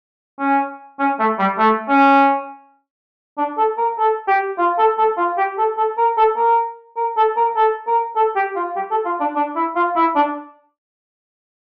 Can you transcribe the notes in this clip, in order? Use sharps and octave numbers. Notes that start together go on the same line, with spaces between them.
C#4
C#4
A3
G3
A3
C#4
D4
A4
A#4
A4
G4
F4
A4
A4
F4
G4
A4
A4
A#4
A4
A#4
A#4
A4
A#4
A4
A#4
A4
G4
F4
G4
A4
F4
D4
D4
E4
F4
E4
D4